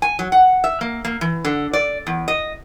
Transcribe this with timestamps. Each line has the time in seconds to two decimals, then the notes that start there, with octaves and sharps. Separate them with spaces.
0.02 G#5
0.19 F#3
0.32 F#5
0.64 E5
0.81 A#3
1.05 A#3
1.21 E3
1.45 D3
1.73 D5
2.07 E2
2.28 D#5